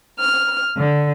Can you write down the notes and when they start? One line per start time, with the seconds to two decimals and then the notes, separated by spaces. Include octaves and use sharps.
0.19 F6
0.77 D3